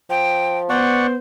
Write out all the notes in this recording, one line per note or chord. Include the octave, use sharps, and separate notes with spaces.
F3 G5
B3 C5 D5 F#5 C#6